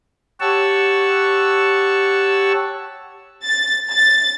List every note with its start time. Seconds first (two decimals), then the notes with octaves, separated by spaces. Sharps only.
0.40 G4 C#5 F#5 A5 C#6 E6
3.44 A6
3.90 A6